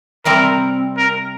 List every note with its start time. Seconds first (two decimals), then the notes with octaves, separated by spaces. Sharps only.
0.25 C3 G3 C4 A#4
0.97 A#4